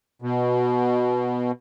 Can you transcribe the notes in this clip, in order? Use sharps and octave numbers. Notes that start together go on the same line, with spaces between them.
B2